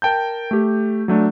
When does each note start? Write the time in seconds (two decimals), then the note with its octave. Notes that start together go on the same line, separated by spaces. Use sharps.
0.02 A#4 G5 A5 G6
0.51 A3 G4
1.08 F#3 A3 D4